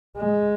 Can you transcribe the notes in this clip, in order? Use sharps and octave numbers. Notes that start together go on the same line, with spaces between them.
G#3